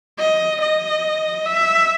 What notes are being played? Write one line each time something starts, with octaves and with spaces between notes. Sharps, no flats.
D#5
D#5
E5